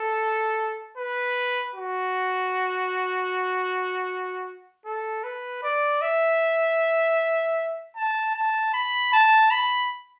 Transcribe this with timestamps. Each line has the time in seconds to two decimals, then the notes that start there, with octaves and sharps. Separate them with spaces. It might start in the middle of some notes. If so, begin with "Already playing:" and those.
Already playing: A4
0.98 B4
1.75 F#4
4.86 A4
5.24 B4
5.63 D5
6.02 E5
7.96 A5
8.35 A5
8.73 B5
9.13 A5
9.51 B5